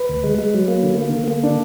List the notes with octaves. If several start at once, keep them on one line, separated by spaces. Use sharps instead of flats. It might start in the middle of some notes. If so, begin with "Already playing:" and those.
Already playing: B4
D2
G#3
G#3
F#3
A#3
D3
A#3
D3
A#3
D4